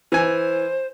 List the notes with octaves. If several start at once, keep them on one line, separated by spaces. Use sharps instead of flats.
E3 C5 G#5